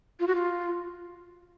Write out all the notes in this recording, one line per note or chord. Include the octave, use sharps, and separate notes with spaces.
F4
F#4
F4